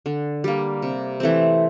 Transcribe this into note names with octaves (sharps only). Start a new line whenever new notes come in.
D3
G3 A#3
C3
E3 A3 C4